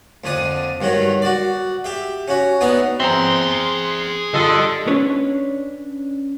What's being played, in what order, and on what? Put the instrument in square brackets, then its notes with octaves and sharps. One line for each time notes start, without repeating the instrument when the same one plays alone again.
[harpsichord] F2 D3 D4 D#6
G2 D#3 F#3 F#4
F#4 D5
G4 E5
C#4 F#4
B3 D4 D#4 C#5 E5
[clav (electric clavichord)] C4 A#5 [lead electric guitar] G#4 E5 [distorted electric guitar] C6
[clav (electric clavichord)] G2 [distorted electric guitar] D3 [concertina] F4 A4 D#5
[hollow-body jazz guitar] C#4 D4 B4 C#5